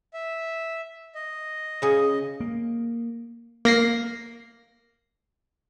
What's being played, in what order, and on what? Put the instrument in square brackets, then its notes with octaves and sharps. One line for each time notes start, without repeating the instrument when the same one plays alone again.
[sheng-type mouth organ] E5
D#5
[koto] C#3 G#4
[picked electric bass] A#3
[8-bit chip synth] A#3 A#6 C7